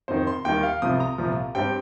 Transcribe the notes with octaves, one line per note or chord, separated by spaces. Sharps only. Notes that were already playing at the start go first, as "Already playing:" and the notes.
F2 D#3 C4 C5
C6
D#2 D#3 G3 A#3 G5
F5
C2 C3 F3 D#6
A#5
C2 A#2 F3
G2 G3 C4 G5